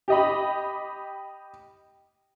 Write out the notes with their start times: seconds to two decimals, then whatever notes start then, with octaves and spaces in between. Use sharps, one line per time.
0.08 G4 D#5 B5